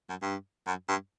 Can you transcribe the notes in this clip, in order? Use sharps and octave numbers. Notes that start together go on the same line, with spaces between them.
F#2
G2
F#2
G2